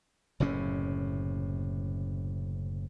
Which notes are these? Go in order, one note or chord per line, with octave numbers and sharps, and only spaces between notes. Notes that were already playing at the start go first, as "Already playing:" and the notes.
F#1 A2 C3 C#4